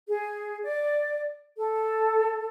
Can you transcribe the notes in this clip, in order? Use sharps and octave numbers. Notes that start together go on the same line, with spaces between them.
G#4
D5
A4